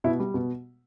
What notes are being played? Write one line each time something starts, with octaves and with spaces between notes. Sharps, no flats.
B2 E4
G3
B2